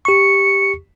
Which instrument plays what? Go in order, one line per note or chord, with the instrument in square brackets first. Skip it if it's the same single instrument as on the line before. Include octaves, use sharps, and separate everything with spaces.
[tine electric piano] G4 C#6 [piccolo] C#7